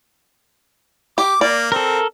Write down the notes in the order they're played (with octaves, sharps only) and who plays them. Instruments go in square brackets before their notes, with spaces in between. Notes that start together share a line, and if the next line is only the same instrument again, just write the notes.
[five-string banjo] G4 [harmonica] D6
[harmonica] A#3 [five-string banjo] D5
[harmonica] C4 [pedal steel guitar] A4 A#4